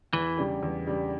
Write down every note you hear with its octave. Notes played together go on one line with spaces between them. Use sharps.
E2 E3
C#3 G3 D4 G4
E2
C#3 G3 D4 G4